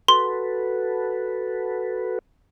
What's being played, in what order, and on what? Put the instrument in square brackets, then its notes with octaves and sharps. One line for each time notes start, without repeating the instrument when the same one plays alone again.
[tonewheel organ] F#4 A4 B4 [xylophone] C6